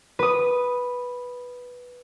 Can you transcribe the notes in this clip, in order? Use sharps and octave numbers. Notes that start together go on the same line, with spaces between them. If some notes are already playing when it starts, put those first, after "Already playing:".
B4 D#6